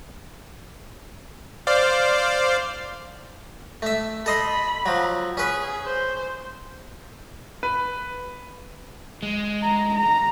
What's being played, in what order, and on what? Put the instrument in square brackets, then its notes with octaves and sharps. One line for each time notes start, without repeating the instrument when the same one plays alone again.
[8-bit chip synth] C5 D5 F5
[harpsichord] A3 E5
[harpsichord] A4 D#5 C6 [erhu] B5
[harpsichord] F3 F#3
[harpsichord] C#4 B4 [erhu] G#4
[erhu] C5
[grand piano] B4
[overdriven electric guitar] G#3
[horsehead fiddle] A#5
A#5